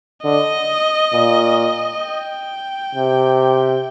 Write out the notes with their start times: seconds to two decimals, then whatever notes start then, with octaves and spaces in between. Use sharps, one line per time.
0.24 D3 D#5
1.13 A#2
2.04 G5
2.95 C3